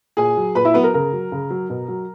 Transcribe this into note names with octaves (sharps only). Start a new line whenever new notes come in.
A#2 G#4 G#5
F#3
A#2 B4 B5
E4 E5
F#3 B3 B4
A#4
C#3 A#4
F#3
C#3
F#3
B2
F#3